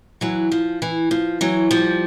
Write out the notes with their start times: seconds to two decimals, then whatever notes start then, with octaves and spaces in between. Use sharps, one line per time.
0.21 E3 F#3
0.52 F3
0.82 E3
1.11 F3
1.41 E3 F#3
1.71 F3 G3